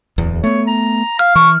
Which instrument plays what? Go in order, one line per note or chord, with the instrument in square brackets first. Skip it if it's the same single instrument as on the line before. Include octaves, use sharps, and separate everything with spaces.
[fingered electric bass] D1 E2
[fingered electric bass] A3 B3 [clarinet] C#5
[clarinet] A#5
[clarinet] F5 [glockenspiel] F6
[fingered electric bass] E3 [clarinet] C#6